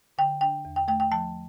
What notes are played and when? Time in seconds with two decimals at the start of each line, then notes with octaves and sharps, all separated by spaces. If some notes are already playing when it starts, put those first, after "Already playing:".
0.18 D3 G5
0.41 D4 G5
0.65 E2
0.76 G5
0.88 A3 G5
1.00 G5
1.11 F3 A5